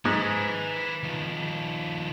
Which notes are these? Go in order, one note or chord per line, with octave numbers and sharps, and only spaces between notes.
G#2 B4 G#5
D#3 F3